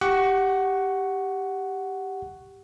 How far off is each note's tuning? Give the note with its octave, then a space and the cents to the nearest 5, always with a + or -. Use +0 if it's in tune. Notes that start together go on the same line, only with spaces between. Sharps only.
G4 +0 F#5 +10 C#6 +0